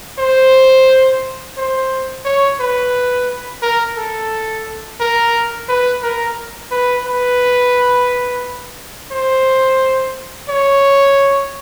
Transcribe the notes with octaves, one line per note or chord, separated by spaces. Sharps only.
C5
C5
C#5
B4
A#4
A4
A#4
B4
A#4
B4
B4
C5
C#5